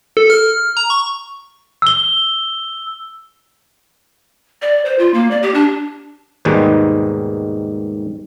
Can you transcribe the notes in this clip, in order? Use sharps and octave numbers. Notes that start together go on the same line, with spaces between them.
A4
F6
A#5
C#6
E6 G7
D5
C5
F4
A#3
D5
G4
D4
D#2 G#2 B2 D#3 G3 G#3